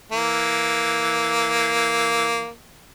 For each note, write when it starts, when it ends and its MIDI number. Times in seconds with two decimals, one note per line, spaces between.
0.12 2.50 52
0.12 2.50 58